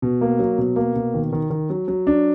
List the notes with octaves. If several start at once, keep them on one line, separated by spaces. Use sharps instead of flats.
B2
A#3
F#3
B2
A#3
B2
D#3
D#3
D#3
F#3
F#3
D4